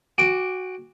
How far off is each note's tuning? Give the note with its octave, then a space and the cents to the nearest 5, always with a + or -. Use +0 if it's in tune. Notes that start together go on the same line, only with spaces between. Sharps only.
F#4 +0 G5 +45 D6 +0